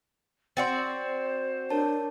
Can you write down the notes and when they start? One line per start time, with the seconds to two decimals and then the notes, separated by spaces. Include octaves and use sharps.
0.57 C4 F#4 C5 D5 C6 A6
1.70 D4 A#4 C#5 A5